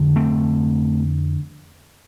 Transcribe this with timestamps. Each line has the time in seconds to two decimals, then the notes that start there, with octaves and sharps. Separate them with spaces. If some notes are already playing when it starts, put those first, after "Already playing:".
Already playing: F2 D3
0.16 A3 C4